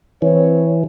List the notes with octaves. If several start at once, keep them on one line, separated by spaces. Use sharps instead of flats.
E3 C4 B4 C#5